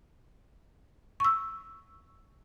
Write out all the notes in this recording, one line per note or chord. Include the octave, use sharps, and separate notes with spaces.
C#6 E6